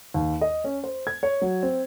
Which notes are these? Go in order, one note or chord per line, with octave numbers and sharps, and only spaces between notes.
D#2
D#5
C#4
C5
G#6
C#5
F#3
C4